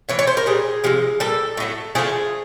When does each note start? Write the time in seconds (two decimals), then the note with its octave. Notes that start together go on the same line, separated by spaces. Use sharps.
0.09 A2 E3 C#5
0.19 C#5
0.27 C5
0.37 A#4
0.46 A#2 G3 G#4
0.84 C3 F3 G#3
1.20 A#2 G3 A4
1.57 A2 F#3 A3
1.95 D3 F3 A3 G#4